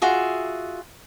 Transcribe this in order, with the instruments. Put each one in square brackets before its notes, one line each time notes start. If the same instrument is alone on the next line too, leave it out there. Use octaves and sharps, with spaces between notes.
[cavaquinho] F4 F#4 G#4 E5